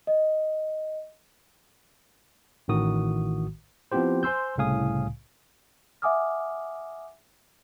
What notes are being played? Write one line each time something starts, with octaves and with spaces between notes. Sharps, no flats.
D#5
A1 A2 D#3 F#4 D#6
F3 B3 C4 E4 G4 C5
C5 G#5 C6 E6 G6
C2 A2 C#3 F5 G#5 D#6
E5 F#5 G#5 D6 D#6 F6